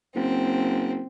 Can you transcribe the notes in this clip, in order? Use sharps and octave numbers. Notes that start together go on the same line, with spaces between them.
F#1 C4